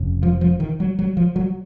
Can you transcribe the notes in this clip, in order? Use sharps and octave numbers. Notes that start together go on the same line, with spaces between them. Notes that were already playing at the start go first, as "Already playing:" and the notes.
Already playing: F1 F2 C#3
F3
F3
D#3
F#3
F#3
F3
F#3